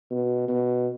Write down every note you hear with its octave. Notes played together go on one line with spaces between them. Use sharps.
B2
B2